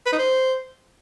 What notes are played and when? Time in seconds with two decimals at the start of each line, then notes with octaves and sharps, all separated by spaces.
0.06 B4
0.12 D#4
0.19 C5